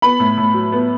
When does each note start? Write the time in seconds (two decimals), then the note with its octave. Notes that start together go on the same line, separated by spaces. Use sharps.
0.02 B3 B5
0.20 A2
0.37 A2
0.54 F#3
0.72 B3